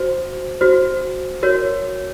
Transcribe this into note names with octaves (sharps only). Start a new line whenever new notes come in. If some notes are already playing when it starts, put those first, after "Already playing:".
Already playing: F#4 C5
F#4 C5
F#4 A#4 C#5